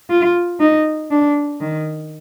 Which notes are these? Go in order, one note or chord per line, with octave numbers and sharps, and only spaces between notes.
F4
D#4
D4
D#3